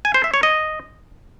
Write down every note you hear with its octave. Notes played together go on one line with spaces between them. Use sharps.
G#5
C5
E5
C#5
D#5